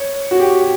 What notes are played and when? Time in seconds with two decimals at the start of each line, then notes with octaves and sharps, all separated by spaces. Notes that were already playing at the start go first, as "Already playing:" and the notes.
Already playing: C#5
0.31 F#4
0.40 G4